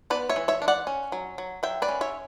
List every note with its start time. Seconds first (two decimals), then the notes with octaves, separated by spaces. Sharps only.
0.10 B3 B4 D5
0.29 C#5 E5
0.36 E3
0.48 C#5 E5
0.62 D4
0.68 D5 F#5
0.87 C#4
1.12 F#3
1.38 F#3
1.63 F#3 E5 G5
1.82 B4 D5
1.88 C#4
2.01 C#5 E5